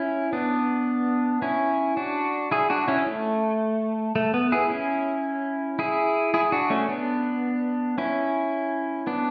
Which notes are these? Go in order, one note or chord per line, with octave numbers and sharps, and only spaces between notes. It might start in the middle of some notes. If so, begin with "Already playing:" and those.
Already playing: C#4 E4
B3 D4
C#4 E4
D4 F#4
E4 G#4
D4 F#4
C#4 E4
A3
A3
B3
E4 G#4
C#4 E4
E4 G#4
E4 G#4
D4 F#4
A3 C#4
B3 D4
C#4 E4
B3 D4